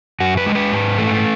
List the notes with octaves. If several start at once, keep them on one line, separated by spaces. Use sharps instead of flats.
F#2 F#4
B4
G#3
B4
G#2
A3